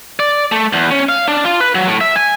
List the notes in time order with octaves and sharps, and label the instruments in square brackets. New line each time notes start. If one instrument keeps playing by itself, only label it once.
[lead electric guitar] D5
A3
E2
C#4
F5
D4
F4
B4
F#3
A2
E5
G#5